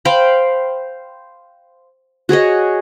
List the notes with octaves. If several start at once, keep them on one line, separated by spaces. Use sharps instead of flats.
C5 F5 G5 B5
F#4 G#4 C#5 D#5